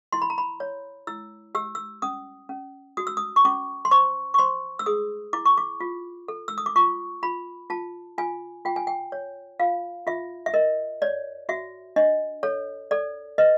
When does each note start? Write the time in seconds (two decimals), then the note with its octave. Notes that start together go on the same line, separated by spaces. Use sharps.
0.12 E4 C6
0.22 B5
0.30 A#5
0.38 B5
0.60 C#5
1.07 E4 E6
1.55 G4 E6
1.75 E6
2.02 C#4 D#6
2.49 C#4
2.97 F#4 D#6
3.07 E6
3.17 D#6
3.36 C#6
3.45 C#4 D6
3.85 C6
3.91 C5 C#6
4.34 C#6
4.38 C5 C6
4.79 E6
4.86 G#4 D#6
5.33 E4 D6
5.46 C#6
5.58 D6
5.80 F4
6.28 A4
6.48 E6
6.58 D#6
6.66 D6
6.76 F4 C#6
7.23 F4 B5
7.70 F4 A5
8.18 F4 G#5
8.65 F4 G5
8.76 G#5
8.87 G5
9.12 C#5
9.60 F4 F5
10.07 F4 E5
10.46 E5
10.54 A#4 D#5
11.02 C#5 D5
11.49 F#4 E5
11.96 D4 D#5
12.43 A4 C#5
12.91 A4 D5
13.38 B4 D#5